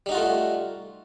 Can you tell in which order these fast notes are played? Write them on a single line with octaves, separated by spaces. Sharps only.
G3 D#4 F#4 F4 A3